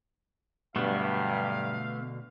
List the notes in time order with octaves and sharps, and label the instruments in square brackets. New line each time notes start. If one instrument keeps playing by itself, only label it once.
[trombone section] G2 F#3 [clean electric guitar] B2 D3 [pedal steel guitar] A3 B3 [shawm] F5